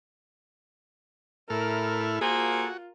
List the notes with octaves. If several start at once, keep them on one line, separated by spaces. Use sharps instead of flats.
A2 E4 A4 A#4 F6
A#3 F4 F#4 G#4 A4 C5